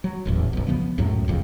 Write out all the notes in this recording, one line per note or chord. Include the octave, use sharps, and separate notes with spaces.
F#3
D#1 A1 E2
B1 F#2
C#3 F3 A#3 B3
C#2 F#2 A2 F#3
E1 F2 C#3